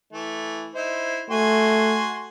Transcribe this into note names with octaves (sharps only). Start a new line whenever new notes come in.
E3 A3
D#4 E4 C5
A3 F#4 G#5 C6